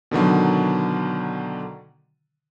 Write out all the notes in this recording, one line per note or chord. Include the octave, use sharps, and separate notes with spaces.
B2 D3 D#3 F#3